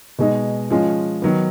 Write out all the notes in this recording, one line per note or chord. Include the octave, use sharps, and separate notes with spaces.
B2 G#3 D#4
F3 G#3 C#4 F4
D#3 F#3 B3